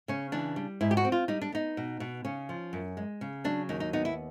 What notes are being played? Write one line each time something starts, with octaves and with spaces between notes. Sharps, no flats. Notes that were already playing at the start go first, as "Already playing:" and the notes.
C#3 C#4
E3 D4
G3
G#2 E4
G4
F#4
C4
F4
G3 D#4
D4
B3 D#4
B2
B2
C#3 C#4
F3
F#2
G#3
C#3
F#3 D4
D#2 D#4
D#4
B3 D#4
E4